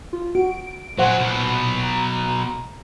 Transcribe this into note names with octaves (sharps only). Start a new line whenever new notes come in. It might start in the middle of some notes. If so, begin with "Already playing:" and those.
F4
F#4 D7
A#2 F#3 C5 F#5 G#5
B1 B2
A#5